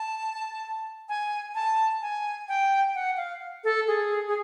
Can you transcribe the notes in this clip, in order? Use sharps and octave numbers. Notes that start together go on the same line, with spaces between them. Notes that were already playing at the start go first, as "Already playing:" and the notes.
Already playing: A5
G#5
A5
G#5
G5
F#5
F5
A4
G#4
G#4